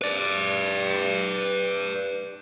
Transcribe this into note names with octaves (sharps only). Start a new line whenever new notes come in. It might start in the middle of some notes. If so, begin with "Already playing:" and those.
B4 D5